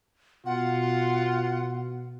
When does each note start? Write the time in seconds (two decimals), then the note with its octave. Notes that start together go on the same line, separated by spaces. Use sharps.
0.46 B2 F4 F#5